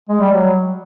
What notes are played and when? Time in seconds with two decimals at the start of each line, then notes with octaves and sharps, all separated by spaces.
0.09 G#3
0.20 G3
0.32 F#3